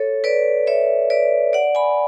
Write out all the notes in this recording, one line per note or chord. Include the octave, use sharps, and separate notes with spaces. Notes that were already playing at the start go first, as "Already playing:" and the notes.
Already playing: A4 C#5
B4 D5
C#5 E5
B4 D5
D5 F#5
G#5 B5